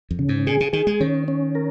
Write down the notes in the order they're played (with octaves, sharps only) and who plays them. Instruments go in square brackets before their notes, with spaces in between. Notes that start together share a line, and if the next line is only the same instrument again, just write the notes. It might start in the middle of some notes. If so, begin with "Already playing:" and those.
[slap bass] F2
[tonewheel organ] C#3
[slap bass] G#2
[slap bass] A#2 [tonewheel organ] G#4
[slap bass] C#3
[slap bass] D#3 [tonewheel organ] G#4
[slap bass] G#3
[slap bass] D#3 [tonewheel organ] C#4
[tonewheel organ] C#4
A#4